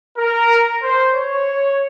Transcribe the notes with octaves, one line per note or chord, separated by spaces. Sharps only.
A#4
C5
C#5